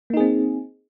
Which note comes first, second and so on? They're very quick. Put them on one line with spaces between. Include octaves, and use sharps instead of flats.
A#3 D#4 G#4 C4